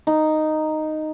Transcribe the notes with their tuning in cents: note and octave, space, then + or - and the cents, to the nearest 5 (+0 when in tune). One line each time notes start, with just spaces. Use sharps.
D#4 -5